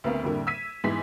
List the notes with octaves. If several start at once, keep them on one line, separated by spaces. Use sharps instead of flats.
D2 B3 C4 A#4 F5
F2 A2 D3 G3 A#3
E6 G#6 B6 D#7
G#2 E3 B3 G#4 B6